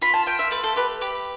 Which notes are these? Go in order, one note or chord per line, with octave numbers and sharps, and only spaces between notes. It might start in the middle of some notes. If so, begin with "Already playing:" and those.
F4 B5
A5
F4 G5
E5
A3 B4
A4
G4 B4
G4 B4